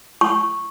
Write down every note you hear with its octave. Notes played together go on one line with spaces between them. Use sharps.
C#6